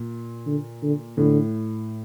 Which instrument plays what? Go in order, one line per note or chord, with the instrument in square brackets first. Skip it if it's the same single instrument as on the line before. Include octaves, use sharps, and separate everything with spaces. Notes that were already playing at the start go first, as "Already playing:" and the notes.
Already playing: [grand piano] A#2
[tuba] D3
D3
[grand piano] A2 [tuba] D3